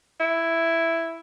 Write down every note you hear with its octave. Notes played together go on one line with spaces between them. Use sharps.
E4